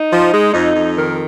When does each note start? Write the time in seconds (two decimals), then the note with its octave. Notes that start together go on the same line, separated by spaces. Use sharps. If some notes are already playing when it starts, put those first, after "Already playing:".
Already playing: D#4
0.11 F3
0.33 G#3
0.53 F2 D#4
0.75 F2
0.97 D#3 A#4